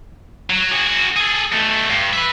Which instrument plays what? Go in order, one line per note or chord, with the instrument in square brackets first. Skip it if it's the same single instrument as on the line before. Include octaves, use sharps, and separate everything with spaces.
[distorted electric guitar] F#3
F#4 G#4
G#4 A4
B2 A3
G2
B4 E5